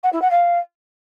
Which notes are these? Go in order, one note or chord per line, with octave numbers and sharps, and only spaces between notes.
F#5
E4
F#5
F5